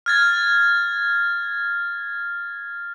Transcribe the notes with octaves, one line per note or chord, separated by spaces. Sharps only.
F6 G#6 A6